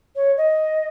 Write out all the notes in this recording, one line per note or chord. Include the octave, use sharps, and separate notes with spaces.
C#5
D#5